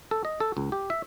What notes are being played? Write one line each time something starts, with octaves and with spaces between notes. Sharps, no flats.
A4
D#5
A4
C#2
G4
E5